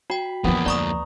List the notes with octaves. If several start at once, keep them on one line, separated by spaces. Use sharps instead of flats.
F#4 G5 B5
F2 E3 A#3 B3 D#4
D2 D5 A#5 C#6 D#6